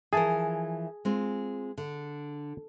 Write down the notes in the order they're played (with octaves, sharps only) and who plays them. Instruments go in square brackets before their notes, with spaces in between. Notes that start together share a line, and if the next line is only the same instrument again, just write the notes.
[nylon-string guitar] E3 F3 A#4 [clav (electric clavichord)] G#4 G#5 A5
[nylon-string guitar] G#3 C4 F4
D3